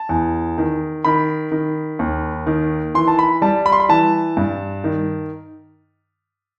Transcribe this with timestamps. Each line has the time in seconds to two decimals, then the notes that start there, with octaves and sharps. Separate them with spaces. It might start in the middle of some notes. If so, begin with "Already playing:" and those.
Already playing: A5
0.09 E2
0.58 D#3
1.05 D#3 B5
1.52 D#3
1.99 D#2
2.47 D#3
2.95 E3 C6
3.08 A5
3.19 B5
3.42 G3 A5
3.66 B5
3.72 C6
3.80 B5
3.89 E3 A5
4.37 G2
4.84 D#3